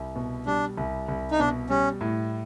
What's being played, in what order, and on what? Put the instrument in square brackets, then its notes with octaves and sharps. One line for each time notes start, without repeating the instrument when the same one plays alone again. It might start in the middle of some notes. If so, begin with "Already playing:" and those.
Already playing: [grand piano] C2
B2
[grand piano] G3 [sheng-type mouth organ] D4
[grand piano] C2
C2
[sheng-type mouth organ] D#4
[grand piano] B2 [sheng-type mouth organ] D4
[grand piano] G3 [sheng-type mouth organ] C#4
[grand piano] A2